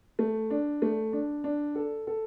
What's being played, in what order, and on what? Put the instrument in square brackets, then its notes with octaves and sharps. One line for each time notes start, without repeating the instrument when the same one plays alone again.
[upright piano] A3
D4
A3
D4
D4
A4
A4